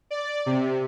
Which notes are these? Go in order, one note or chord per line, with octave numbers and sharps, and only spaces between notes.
D5
C3